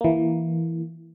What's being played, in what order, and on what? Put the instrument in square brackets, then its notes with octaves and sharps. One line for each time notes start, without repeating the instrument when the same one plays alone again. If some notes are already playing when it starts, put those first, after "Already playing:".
[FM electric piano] E3 A#3